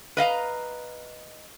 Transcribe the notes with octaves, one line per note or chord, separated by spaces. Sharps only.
B4 D#5 F5 A#5